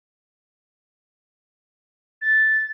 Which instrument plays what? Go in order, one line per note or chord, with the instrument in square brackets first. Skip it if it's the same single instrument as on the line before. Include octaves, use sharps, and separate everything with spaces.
[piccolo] A6